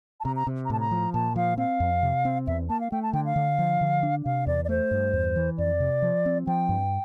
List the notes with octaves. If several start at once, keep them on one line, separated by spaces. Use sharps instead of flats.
A5
C3 A#5
A#5
C3
A#5
A2 A5
A#5
F3
A#2 A5
F3 F5
C4 F5
F2
C3
C4
E2 E5
A#3 A5
F5
A3 G5
A5
D3 G5
F5
D3
F3
D3
D4
C3 F5
E2 D5
D5
A3 C5
G2
E2
E3
F2 D5
C3
F3
C4
F3 G5
G2